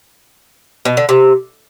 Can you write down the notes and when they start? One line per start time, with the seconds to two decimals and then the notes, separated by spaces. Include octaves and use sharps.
0.85 B2
0.97 D3
1.09 C3